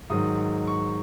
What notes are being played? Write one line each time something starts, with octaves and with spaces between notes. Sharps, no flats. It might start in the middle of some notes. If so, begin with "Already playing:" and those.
G#2 D#3 F#3 D#6
C#6